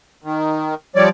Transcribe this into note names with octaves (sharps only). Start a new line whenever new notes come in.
D#3
F3 G3 C#5 D5